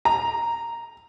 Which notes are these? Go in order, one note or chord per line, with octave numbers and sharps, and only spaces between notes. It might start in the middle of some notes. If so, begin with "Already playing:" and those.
A#5